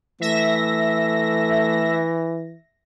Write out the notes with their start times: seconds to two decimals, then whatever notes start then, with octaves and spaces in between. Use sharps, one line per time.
0.21 E3 A3 E5 A#6